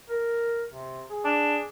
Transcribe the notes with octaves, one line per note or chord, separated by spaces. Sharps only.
A#4
C3
G#4
D4